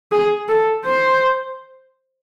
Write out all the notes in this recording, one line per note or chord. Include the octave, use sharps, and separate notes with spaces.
G#4
A4
C5